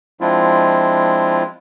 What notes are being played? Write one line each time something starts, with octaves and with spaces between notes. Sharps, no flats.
F3 G#3 C4 D4 E4 F4